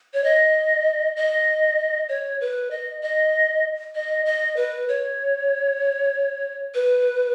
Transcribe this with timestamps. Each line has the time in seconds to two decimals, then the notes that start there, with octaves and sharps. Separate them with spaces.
0.14 C#5
0.24 D#5
1.16 D#5
2.09 C#5
2.41 B4
2.71 D#5
3.02 D#5
3.95 D#5
4.26 D#5
4.57 B4
4.89 C#5
6.75 B4